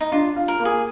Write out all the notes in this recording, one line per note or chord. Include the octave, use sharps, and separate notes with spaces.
D#4
D4 F4
F4
A#4
A#3
G#4